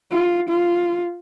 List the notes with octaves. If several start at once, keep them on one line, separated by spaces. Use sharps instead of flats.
F4
F4